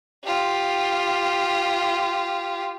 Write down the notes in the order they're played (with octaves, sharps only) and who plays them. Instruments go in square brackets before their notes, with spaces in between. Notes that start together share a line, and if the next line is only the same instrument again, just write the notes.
[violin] F4 G4